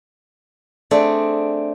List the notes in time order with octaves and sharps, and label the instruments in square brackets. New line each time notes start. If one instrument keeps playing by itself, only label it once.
[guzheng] A3 C4 D4 G#4 A4